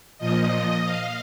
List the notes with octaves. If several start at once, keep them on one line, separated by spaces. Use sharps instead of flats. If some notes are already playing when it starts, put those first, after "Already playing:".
A#2 F3 D#5
F5